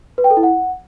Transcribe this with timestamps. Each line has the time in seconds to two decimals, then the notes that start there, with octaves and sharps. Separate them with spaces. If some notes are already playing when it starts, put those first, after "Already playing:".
0.18 B4
0.24 G5
0.31 A4
0.37 E4
0.43 F#5